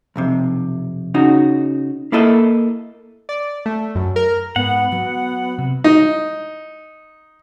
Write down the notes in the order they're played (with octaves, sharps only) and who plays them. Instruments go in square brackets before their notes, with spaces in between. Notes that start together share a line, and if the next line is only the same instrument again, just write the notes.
[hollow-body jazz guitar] B1 F2 C3
C#3 D#4 F#4
A#3 E4 A4 D#5
[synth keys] D5
A3
F#2
A#4
[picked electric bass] G#2 [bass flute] B3 [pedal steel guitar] F#5
[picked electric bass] F#3 [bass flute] B3
[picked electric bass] C3
[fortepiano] D#4